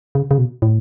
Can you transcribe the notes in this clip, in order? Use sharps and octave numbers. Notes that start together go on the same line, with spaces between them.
C#3
C#3
B2
A2